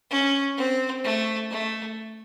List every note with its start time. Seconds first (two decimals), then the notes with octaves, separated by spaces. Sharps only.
0.11 C#4
0.57 C4
1.05 A3
1.51 A3